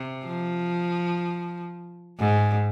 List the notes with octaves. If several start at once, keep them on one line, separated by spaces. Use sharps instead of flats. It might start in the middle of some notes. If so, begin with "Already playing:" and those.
Already playing: C3
F3
G#2